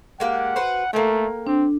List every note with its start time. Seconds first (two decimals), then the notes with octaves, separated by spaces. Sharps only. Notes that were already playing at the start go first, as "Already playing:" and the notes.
0.20 G#3 A#3 G4 F#5
0.56 F#4 B4 C5
0.93 A3 A#3 A4 G5
1.47 C4 D4